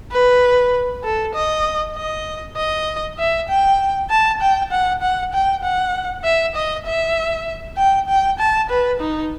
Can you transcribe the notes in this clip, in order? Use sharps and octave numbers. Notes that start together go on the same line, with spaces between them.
B4
A4
D#5
D#5
D#5
E5
G5
A5
G5
F#5
F#5
G5
F#5
E5
D#5
E5
G5
G5
A5
B4
D#4